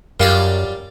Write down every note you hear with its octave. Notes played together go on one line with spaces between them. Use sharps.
F#2 G3 F4 A#4 D5 F5